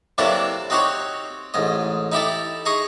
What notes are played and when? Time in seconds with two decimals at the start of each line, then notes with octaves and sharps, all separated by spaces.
0.18 C3 F#3 A#3 D4 E4 A4
0.70 C4 D#4 F#4 G4 C5 C#5
1.54 A1 G#2 D#5
2.12 D#4 E4 G4 A4
2.66 D#4 G#4 D#5 C#6 D#6